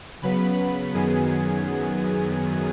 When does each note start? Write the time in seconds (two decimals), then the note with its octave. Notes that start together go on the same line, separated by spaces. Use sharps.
0.22 C#3 F#3 B3 B4 B5
0.94 F#2 D#3 F#3 B3 G#4 G#5